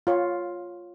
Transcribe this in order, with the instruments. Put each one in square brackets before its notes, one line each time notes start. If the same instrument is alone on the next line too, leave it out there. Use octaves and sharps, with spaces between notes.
[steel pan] F4 C#5